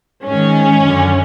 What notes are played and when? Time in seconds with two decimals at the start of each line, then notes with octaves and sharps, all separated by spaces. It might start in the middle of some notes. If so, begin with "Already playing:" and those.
0.25 G#2 D#3 C#4
0.83 F#2 D3